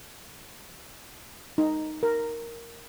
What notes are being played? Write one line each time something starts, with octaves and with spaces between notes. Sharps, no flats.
D#4
A#4